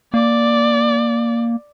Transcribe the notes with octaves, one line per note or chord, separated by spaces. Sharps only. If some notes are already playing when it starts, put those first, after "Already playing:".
A#3 D5